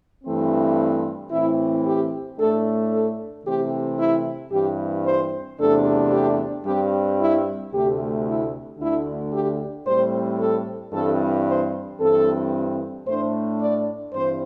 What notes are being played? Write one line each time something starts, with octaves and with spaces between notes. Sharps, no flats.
G2 E3 A3 C4
A2 E3 C4 E4
G4
A2 A3 D4 A4
A4
C3 E3 A3 C4 G4
E4
G2 E3 C4 G4
C5
E2 C3 A3 D4 A4
G4
G2 G3 C4 G4
E4
D2 C3 A3 G4
E4
D2 D3 A3 D4 E4
G4
A2 G3 C4 C5
A4
G2 E3 C4 A4
C5
G2 E3 C4 A4
A2 A3 D4 C5
D5
G2 E3 C4 C5